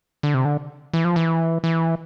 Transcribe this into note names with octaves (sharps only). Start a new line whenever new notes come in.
D3
C3
D3
E3
F3
E3
E3